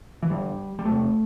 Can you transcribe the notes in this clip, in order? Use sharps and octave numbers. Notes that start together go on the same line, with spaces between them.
E3
G2 D3 G3
G3
E2 C3 A3